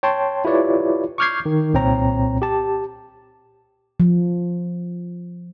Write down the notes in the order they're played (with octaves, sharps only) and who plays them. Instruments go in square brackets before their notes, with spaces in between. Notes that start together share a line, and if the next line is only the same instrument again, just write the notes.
[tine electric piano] C#5 G5 A5 C6
E4 F4 G4 B4 C#5 D5
C#6 D6 F6 G6 G#6 C7
D#3
C2 A#2 C4 C#5 G5 A#5
G4 A5
[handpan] F3